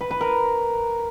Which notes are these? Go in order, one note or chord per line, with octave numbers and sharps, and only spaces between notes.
B4
B4
A#4